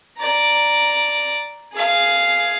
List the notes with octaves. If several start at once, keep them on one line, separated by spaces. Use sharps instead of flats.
D5 A#5
G#4 F5